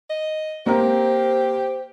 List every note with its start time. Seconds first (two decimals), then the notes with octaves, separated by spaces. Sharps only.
0.10 D#5
0.66 A#3 C4 G4 A#4 C5